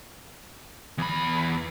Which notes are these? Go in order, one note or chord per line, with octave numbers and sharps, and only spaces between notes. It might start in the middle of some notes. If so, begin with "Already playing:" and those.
E2 B5